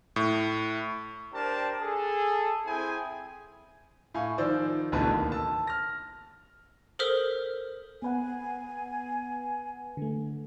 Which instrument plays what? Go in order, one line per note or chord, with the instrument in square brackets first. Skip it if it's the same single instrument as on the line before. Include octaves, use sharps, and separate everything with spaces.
[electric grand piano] A2
[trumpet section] D4 G4 A#4 C5 A5
G#4 A4
C4 E4 G#4 G5 G#5
[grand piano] A2 F5 G#5 C#6
D#3 F3 C5 D5 E6
D1 A1 B2 D3 B4 A5
D#2
A5 E6
F6 A#6
[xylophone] A4 A#4 C5 D#6 F6 B6
[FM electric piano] B3 B4 F#5 [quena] G#5
[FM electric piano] D3 A3